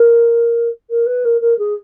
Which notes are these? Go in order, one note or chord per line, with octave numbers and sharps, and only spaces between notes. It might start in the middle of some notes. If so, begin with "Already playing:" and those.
Already playing: A#4
A#4
B4
A#4
A#4
G#4